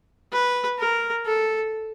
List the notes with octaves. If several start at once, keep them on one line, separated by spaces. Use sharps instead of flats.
B4
A#4
A4